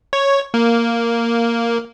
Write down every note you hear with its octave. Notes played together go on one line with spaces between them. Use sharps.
C#5
A#3